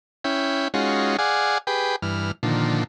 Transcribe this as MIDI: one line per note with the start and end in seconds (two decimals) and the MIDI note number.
0.24 0.68 61
0.24 0.68 64
0.24 0.68 79
0.74 1.17 56
0.74 1.17 61
0.74 1.17 63
0.74 1.17 65
0.74 1.17 66
1.19 1.58 68
1.19 1.58 74
1.19 1.58 77
1.19 1.58 78
1.19 1.58 80
1.67 1.96 67
1.67 1.96 68
1.67 1.96 71
1.67 1.96 79
2.02 2.32 43
2.02 2.32 52
2.02 2.32 89
2.43 2.84 46
2.43 2.84 50
2.43 2.84 51
2.43 2.84 53